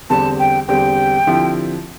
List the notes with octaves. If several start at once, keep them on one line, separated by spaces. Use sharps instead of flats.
E2 D3 G3 C4 G4 A5
G5
E2 D3 G3 C4 G4 G5
D3 F3 C4 E4 G4